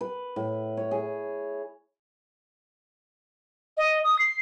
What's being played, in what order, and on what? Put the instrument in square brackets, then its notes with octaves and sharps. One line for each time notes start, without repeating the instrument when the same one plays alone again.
[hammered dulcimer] B4
A2
C#5
G#4
[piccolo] D#5
D#6
C7